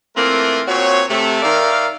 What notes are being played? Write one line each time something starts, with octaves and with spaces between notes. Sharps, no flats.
E3 A3 A#3 C4 F4 A#4
A#2 C4 F#4 C#5
C3 A3
D#3 A#4 D5 E5 F5